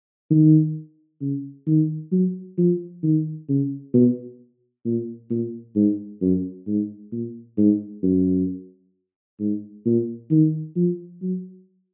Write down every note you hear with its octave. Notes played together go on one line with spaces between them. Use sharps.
D#3
C#3
D#3
F#3
F3
D#3
C#3
B2
A#2
A#2
G#2
F#2
G#2
A#2
G#2
F#2
G#2
A#2
D#3
F3
F#3